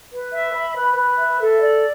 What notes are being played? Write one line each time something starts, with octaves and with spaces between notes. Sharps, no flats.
B4
E5
B5
B4
B4
E5
A4
D5